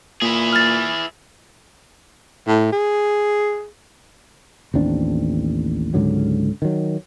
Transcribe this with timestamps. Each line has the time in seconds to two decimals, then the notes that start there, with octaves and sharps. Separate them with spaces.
0.22 A#2 E4 G#4
0.53 F6 A6
2.48 A2
2.72 G#4
4.74 A1 D#2 C4 D4
5.94 C#2 G#2 D3 F#3
6.62 D#3 F#3